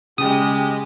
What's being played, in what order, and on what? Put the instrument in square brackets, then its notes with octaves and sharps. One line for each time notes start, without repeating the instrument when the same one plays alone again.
[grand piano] C#3 [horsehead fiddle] G#3 G4 [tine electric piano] D#6